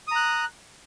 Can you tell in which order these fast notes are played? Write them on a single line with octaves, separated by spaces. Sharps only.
D#6 A#5 F#6